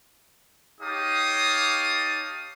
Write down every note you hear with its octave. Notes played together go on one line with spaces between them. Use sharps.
D#4 G4 C#5 F5 A5 D#6